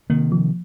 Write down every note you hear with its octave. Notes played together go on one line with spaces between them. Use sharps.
C3 D#3 A#3
F3